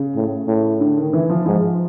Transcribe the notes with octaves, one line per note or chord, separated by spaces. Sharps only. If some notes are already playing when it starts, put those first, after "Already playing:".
Already playing: C#3
A2
A2
D3
D#3
E3
F3
G#2 F3